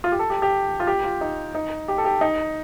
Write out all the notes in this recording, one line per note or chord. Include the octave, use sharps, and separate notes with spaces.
F4
G4
A4
G4
G4
F4
G4
F4
D#4
D#4
G4
A4
G4
D#4